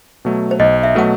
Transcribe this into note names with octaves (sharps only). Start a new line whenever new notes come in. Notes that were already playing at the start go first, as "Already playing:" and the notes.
B2 F#3 A3
C5
B1 D#5
E5
B2 F#3 A3 F#5